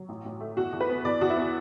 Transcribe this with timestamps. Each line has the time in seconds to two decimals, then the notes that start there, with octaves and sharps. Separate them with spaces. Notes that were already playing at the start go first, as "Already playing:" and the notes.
Already playing: F#3
0.09 A1
0.25 A1
0.40 A3
0.57 E2 F#4
0.72 E2
0.81 B4
0.89 B3
1.05 E2 D5
1.21 E2 F#4
1.30 E4
1.36 B3